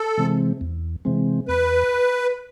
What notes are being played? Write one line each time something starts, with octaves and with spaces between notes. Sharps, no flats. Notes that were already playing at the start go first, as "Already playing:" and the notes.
Already playing: A4
C3 E3 G#3 C4
E2
C3 E3 G#3 C4
E2 B4